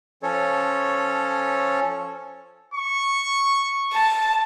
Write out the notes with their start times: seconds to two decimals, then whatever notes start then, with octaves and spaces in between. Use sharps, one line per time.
0.23 F3 C#4 A4 C#5
2.74 C#6
3.93 A5